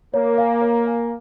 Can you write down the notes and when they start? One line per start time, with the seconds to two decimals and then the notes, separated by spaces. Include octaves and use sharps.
0.14 A#3 C#5
0.38 F5 G#5
0.61 C#5
0.86 F5 G#5